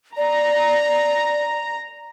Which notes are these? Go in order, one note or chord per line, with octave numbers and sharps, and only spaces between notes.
D5 A#5